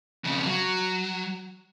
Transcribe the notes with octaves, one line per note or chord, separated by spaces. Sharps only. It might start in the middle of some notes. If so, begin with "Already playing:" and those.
F2 C#3
F#3